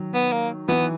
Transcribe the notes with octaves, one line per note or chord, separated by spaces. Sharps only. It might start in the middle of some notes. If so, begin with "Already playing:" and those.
Already playing: D#3 F#3
B3
A#3
E3 B3